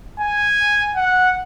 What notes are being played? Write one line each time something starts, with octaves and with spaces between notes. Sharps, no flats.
G#5
F#5